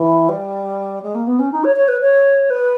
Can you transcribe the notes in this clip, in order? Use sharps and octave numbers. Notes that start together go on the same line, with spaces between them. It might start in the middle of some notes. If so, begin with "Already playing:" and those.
Already playing: E3
G3
G#3
A#3
B3
C#4
D#4
C#5
C#5
B4
C#5
B4